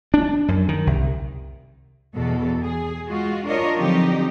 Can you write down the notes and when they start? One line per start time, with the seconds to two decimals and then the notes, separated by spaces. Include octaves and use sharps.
0.14 D4
0.48 F#2
0.69 D#3
0.87 C2
2.15 E2 B2 A4
2.62 G#4
3.07 G#3 F4 F#4
3.46 D4 F4 A#4 C#5 D#5
3.78 D3 F3 F#3 C4 D#4 G4